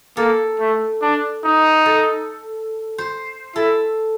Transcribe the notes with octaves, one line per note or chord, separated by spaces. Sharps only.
A#3 A4
A3
D4
D#4
A4
C5
E4 A4